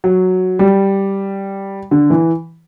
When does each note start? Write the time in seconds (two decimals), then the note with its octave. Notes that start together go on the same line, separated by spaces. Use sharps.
0.04 F#3
0.59 G3
1.91 D3
2.10 E3